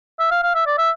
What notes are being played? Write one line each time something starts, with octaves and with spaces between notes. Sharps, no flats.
E5
F5
F5
E5
D5
E5